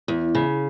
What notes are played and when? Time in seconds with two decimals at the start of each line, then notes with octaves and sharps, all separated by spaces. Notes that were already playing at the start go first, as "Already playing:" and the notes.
0.08 E2
0.35 C#3